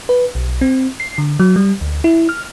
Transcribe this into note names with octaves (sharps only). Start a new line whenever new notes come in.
B4
B1
C4
C7
D3
F#3
G3
D2
E4
F6